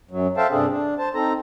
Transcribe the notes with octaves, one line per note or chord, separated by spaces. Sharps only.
F#2 F#3
A4 C5 E5 F5 G5 A5
G2 C3 C4 D4 G#4 A4
D4
C5 A5
C4 D#4 A4 A#5